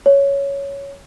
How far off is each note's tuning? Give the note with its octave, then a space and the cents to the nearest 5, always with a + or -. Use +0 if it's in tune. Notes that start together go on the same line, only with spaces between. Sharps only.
C#5 +5